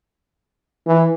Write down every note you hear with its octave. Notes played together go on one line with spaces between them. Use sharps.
E3